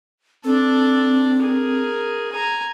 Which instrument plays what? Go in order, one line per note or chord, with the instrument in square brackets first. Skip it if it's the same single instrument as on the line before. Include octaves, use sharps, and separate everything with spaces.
[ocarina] C4 [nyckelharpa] D4 A4
[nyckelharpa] G#4 A#4
G#5 A#5